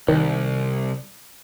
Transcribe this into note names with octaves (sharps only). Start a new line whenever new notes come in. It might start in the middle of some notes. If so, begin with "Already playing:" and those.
C2 D#3